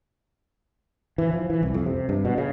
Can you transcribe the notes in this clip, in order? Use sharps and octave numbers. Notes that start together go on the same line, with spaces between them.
E3
F3
E3
C2
F2
C3
G2
B2
C#3